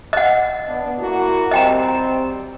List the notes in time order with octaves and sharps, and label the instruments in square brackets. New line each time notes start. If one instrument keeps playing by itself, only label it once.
[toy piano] D#5 F#5
[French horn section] B3 D4
A#3 E4 F#4
[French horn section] G3 C4 [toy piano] D#5 G5 A#5